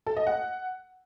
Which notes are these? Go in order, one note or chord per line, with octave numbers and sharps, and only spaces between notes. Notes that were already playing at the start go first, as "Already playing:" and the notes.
A4
D#5
F#5